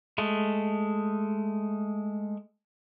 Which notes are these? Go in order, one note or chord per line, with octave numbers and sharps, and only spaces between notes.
G#3 A3